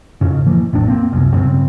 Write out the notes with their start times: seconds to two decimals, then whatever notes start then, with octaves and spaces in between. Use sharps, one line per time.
0.21 F2 G#2 C#3
0.47 E3 F3 A#3
0.73 A1 F2 A2 D4
0.88 A#3 C4
1.12 F1 C2 F#2
1.34 G2 C#3 B3 C4